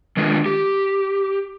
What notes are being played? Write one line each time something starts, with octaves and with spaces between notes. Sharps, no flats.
D#3 G#3 D4 F4 B4
G4